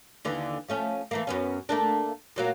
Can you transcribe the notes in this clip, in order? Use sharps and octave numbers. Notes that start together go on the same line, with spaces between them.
D#2 D3 E3
F3 A3 C#4
E3 A3 A#3
F#2 B3 C#4
A3 A#3 D4
A#2 F#3 A#3